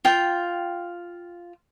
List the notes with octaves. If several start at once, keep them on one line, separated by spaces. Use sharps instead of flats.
F4 G5